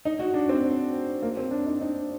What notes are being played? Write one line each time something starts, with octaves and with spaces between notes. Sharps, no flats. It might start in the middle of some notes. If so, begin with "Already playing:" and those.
D#4
F#4
D4
C4
A#3
C4
D4
D#4
D#4